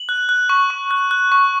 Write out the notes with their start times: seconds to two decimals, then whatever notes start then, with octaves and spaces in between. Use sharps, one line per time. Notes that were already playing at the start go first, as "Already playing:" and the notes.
Already playing: F#7
0.09 F#6
0.29 F#6
0.49 C#6
0.70 C#6
0.91 F#6
1.11 F#6
1.32 C#6